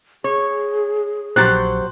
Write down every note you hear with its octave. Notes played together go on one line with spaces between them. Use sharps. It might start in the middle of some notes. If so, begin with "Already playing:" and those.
G#4 C#5
A#1 F#3 G4 C5 F#6 A6